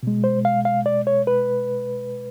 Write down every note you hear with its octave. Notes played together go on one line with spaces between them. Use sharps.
B2 G#3
C5
F5
F5
D5
C#5
B4